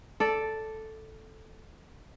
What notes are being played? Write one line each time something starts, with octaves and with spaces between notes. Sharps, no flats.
A4 D5